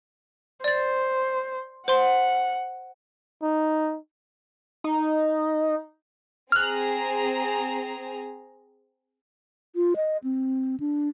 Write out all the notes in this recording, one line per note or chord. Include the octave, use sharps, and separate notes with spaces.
C5 D5 A6
C5 F#5 C6
D#4
D#4
C4 G#4 A#5 F6 F#6
F4
D#5
C4
D4